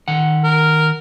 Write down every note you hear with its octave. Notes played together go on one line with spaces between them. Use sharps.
D#3 F#5
A#4